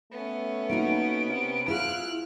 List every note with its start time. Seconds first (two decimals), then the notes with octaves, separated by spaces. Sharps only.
0.12 A3 B3 C#4
0.69 A#3 D#4 F#4 D7
1.26 C3
1.68 E4 F4 G#4 F6 F#6